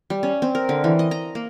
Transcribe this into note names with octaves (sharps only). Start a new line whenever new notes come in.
G3
C#4
C4
A#4
D3
E3
D#5
A#5
A#3